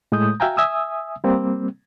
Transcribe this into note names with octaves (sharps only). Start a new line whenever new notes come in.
A2 G#3 A3 D#6 G6
F#4 E5 F5 G5 G#5 A#5
E5 G#5 D#6 E6
G3 A#3 C4